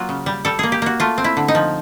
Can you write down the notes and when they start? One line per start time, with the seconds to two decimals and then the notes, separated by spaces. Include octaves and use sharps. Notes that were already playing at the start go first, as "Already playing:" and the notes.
Already playing: F#3 A#3 F4
0.09 C#3
0.26 G3
0.45 G3 A4
0.59 A#3 G#4
0.72 G4
0.82 A#3 F#4
1.00 A3 F4
1.18 C4
1.24 E4
1.37 D3
1.48 D#4
1.55 F3